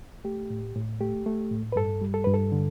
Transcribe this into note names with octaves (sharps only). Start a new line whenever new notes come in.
A3 G4
A2
A2
A3 G4
A3
A2
B4
G2 A4
G3
A4
G2 B4
A4
D3